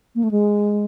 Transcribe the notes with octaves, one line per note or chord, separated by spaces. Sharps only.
A#3
A3
G#3